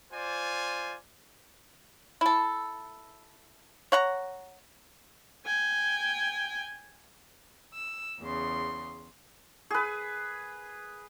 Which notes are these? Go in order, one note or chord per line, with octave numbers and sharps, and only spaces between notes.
F4 C5 D5 G#5
E4 A4
C#5 F#5 A#5
G5 G#5
E6
E2 C#3 C6
G#4 B4